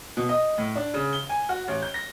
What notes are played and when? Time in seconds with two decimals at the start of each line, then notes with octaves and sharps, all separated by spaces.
0.17 B2
0.29 D#5
0.58 A2
0.76 D4
0.94 C#3
1.13 G7
1.29 G#5
1.49 F#4
1.68 A1
1.82 G6
1.94 A#6